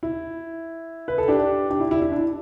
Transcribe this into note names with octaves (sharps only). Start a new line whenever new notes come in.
E4
B4
A4
D4 G4
D4 G4
E4
E4
E4
D4